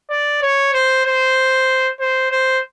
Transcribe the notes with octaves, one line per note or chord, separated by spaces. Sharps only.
D5
C#5
C5
C5
C5
C5